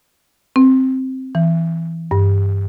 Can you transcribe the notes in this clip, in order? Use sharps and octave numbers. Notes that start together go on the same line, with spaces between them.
C4
E3
G2